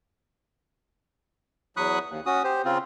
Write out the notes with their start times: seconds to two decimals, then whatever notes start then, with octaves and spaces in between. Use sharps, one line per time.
1.77 E2 F#3 B5 C#6 D#6 F#6
2.10 D#2
2.26 C#4 F#4 D#6
2.44 G4 C5
2.65 C#3 C4 F4